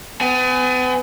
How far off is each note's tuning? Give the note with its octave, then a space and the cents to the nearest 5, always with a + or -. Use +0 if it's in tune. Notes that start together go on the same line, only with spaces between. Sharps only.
B3 +40 G#5 +10